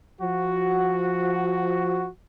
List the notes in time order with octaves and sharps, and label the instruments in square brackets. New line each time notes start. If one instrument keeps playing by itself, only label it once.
[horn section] F3 F#4